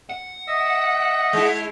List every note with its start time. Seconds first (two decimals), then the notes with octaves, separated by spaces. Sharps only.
0.09 F#5
0.47 D#5 E5 E6
1.33 G#3 E4